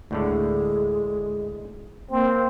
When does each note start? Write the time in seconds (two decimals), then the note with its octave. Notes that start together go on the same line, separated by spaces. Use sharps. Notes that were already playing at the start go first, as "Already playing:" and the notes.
0.11 D2 A2 D3 G#3
2.11 A#3 C4